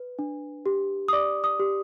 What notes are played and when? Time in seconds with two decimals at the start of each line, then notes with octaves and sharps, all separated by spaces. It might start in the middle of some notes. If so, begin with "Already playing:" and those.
Already playing: B4
0.19 D4
0.66 G4
1.08 D#6
1.13 D5 D6
1.44 D#6
1.59 G4